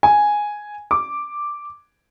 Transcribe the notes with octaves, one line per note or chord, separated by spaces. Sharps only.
G#5
D6